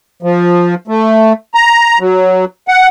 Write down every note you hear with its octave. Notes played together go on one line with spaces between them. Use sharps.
F3
A3
A#5
F#3
F#5